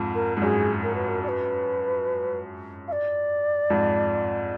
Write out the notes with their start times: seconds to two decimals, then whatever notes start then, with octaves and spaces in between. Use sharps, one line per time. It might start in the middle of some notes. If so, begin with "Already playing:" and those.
Already playing: F2 G#2
0.15 A#4
0.37 G#2
0.42 F#2 G#4
0.83 A#4
0.95 B4
1.08 A#4
1.24 D5
1.28 B4
2.88 F5
2.92 D5
3.70 F2 G#2